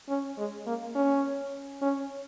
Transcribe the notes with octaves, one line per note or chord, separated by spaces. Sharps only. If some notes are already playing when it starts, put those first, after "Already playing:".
C#4
G#3
A#3
C#4
C#4